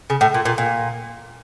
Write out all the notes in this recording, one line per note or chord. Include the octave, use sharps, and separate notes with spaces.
C#3
A2
A#2
A#2
A#2